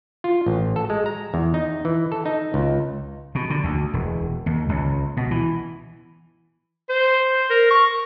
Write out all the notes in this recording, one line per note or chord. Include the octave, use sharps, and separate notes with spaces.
F4
A1
A4
G#3
A#5
E2
D#4
E3
A4
D#4
C#2
B2
D3
D2
E1
D#2
C#2
B2
E3
C5
A#4
C#6